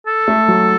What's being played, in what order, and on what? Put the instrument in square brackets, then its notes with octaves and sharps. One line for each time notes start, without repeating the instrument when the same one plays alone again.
[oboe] A4
[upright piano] A3
F#3